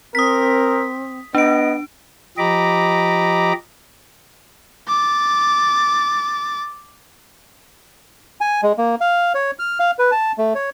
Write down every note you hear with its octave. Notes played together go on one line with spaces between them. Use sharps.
C4 A#4 D#6 B6
B3 D4 D#5 D7
F3 G4 D#5 A#5 B5 D6
D6 A6
G#5
G#3
A#3
F5
C#5
F6
F5
B4
A5
A3
C#5